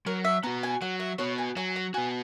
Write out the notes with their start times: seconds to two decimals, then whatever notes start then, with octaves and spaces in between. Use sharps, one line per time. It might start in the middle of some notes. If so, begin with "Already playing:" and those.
0.06 F#3 A#4
0.25 E5
0.43 B3 F#4 A#5
0.63 G#5
0.81 F#3 F#5
1.00 E5
1.18 B3 F#4 C#5
1.38 G#5
1.56 F#3 G#5
1.76 A#5
1.94 B3 F#4 G#5